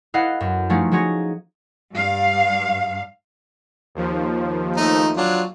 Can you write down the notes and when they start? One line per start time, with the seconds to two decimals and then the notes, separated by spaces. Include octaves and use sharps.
0.14 E4 A4 B4 D#5 F5 F#5
0.41 F#2
0.70 F3 A3 C#4 D#4 F4 F#4
0.92 F3 F#4 G#4 C#5 A#6
1.93 G2 F5
3.95 D#2 F3
4.77 A3 D#4
5.17 F#3 D4 F4